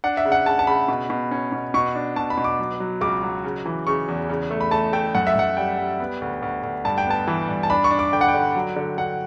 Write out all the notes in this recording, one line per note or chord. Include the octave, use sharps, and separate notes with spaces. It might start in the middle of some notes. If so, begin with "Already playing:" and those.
D4 F#5
E5
C#3
F#5
C#3 A5
A5
C#3 B5
B2
B2
C#4
B2
B2 C#6
D4
B2 A5
B5
B2
D6
F#3
F#3
C#2 D6
F#3
C#3
E3
C#3 C#6
E2
C#3
A3
B5
A3 A5
A3 G5
F#2 F#5
E5
F#2 F#5
G3 G5
G3
B3
D2
D2
D2
G2 A5
G5
B3 A5
E3
G2
A5
D4 B5
C#6
D4
D6
D3 G5
F#5
G5
D3
F#3
D3
D3 F#5